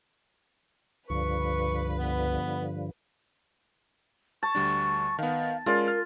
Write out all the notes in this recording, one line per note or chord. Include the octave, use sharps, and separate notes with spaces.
C#2 G2 D3 F3 B4 C#6
B3
A5 C#6
D2 G3 D4
D#3 B3 F5
G#3 C#4 F4 A#4 D5
F6